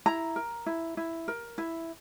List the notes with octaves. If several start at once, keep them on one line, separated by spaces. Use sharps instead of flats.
E4 A#5
A#4
E4
E4
A#4
E4